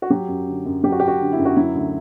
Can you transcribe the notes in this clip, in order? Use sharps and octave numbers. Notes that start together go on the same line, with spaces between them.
F#4
F#3 G4
F#2
D3
F#2
F#3 G4
F#4
F#2 G4
F#4
D3
E4
F#2
F#4
F#3 E4
D2